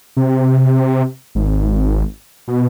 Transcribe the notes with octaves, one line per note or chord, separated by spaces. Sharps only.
C3
G#1
B2